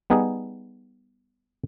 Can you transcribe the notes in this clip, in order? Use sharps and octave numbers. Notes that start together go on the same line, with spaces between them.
G3 B3 D#4 G#4